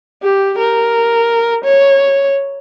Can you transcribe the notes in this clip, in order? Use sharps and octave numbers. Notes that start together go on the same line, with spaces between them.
G4
A#4
C#5